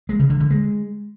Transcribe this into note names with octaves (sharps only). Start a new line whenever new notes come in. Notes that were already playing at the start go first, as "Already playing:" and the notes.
G#3
C#3
D3
D3
G#3